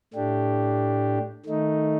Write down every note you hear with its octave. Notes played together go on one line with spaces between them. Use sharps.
A2 A3 D4 G4
D#3 A3 D#4